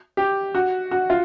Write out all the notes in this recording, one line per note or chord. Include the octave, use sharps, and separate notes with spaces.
G4
F#4
F#4
F4